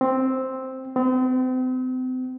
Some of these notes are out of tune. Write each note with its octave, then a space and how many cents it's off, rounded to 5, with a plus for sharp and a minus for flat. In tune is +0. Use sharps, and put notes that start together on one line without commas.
C4 +0
C4 -40